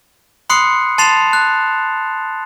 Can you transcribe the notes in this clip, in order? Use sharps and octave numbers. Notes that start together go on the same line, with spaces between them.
B5 C6 D#6 F#6 C7 C#7
A5 C6 A6 C7 E7 F7
F#6